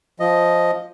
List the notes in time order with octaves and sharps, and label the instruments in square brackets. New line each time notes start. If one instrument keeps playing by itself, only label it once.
[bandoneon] F3 D#5